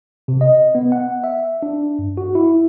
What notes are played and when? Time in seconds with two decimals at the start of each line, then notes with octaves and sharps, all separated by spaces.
0.28 C3
0.41 D#5
0.75 B3
0.92 F#5
1.24 E5
1.62 D4
1.99 G2
2.17 F#4
2.35 E4